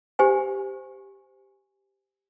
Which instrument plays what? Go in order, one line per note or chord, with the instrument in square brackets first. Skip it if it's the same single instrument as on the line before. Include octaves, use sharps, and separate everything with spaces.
[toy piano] G4 C5 G#5